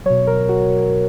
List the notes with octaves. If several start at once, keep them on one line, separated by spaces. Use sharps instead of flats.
B2 F#3 C#5
A#4
F#4